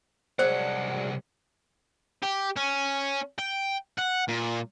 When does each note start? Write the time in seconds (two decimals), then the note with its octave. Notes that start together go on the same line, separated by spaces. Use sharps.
0.39 C2 F#3 G#3 D4 C5 F#5
2.22 G4
2.56 C#4
3.39 G5
3.99 F#5
4.28 A#2